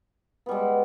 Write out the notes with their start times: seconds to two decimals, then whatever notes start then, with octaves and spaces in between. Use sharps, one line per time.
0.46 B3
0.49 G3
0.51 G#3